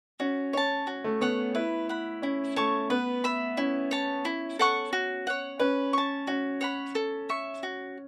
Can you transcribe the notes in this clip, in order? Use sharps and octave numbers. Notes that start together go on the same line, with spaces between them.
C#4 F#4
C#4 C#5 A5
F#4
A3
B3 C#5 F#5
E4 B4
F#5 B5
C#4 E4
A3 C#5 A5 C#6
B3 B4
E5 B5
C#4 E4
C#5 A5
E4
A4 F#5 C#6
F#4
C#5 F#5
C#4 B4
A5 C#6
C#4 F#4
C#5 F#5 B5
A4
E5 C#6
F#4